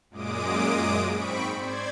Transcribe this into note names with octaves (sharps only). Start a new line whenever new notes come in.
F#2 A#2 G#3 D6 D#6 D7
G#2 C4 B5 C#6 B6 D7
C5 D5 G#6